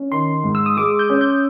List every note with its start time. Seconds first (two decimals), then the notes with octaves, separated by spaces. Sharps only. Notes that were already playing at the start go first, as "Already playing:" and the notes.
Already playing: C#4
0.11 D#3 C6
0.44 G#2
0.55 E6
0.66 D#6
0.77 G#3 D6
0.99 G6
1.10 C#4
1.21 G6